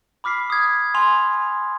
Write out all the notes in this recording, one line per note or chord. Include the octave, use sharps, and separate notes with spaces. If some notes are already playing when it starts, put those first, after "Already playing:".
B5 D6 F6 B6 C7
D#6 G#6
G#5 C6 F7